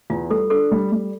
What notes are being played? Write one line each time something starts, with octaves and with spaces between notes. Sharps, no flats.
E2 F4
G3 A4
D4 A4
G3
G3